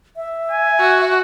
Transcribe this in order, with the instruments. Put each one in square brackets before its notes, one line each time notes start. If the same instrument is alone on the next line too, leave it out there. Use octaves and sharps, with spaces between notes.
[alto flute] E5
[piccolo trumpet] G#5
[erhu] F#4